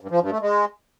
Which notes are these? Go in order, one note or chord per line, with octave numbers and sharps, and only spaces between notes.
G2
F3
G2
A3
G#3